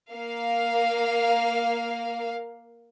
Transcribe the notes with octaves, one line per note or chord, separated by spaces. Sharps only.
A#3 F5